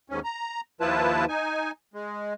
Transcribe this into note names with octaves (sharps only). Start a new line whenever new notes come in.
D#2 G#2 C#4
A#5
D#2 F3 E4 F4 B4 A5
D#4 G#5
G#3